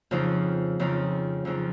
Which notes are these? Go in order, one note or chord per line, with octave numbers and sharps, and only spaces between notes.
F2 C#3 F3 C4 D#4
F2 C#3 F3 C4 D#4
F2 C#3 F3 C4 D#4